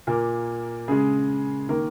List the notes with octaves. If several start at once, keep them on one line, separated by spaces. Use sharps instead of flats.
A#2 A#3 A#4
C#3 G#3 G#4
D#3 A#3 A#4